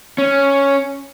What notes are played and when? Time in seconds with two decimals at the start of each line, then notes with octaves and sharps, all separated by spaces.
0.18 C#4